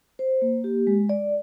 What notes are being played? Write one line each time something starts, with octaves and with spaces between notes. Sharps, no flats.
C5
A#3
G4
G#3
D5